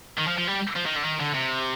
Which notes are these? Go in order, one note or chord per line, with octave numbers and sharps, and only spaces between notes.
D#3
F3
F3
G3
F3
D#3
D3
D#3
D3
C3